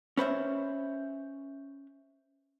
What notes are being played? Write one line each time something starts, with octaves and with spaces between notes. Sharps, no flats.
C#4 B4 C5 E5